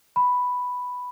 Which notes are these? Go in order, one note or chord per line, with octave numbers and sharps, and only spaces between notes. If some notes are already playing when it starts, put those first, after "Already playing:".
B5